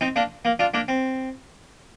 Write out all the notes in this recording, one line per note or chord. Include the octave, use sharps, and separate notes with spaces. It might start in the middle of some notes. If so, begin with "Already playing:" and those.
C4 D#4
A#3 D4
A#3
D4 F4
A#3 D4
C4